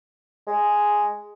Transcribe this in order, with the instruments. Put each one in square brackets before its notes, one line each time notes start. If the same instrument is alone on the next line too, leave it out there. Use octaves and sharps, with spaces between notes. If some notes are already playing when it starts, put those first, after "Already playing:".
[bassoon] G#3